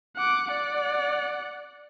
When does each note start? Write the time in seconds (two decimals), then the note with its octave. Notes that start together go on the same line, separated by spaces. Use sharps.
0.17 F#5 D6
0.52 D5 F#5